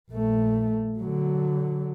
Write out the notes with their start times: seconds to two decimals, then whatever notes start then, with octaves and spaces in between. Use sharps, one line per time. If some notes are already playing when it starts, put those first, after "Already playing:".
0.11 A#1 A3
0.99 D3 F#3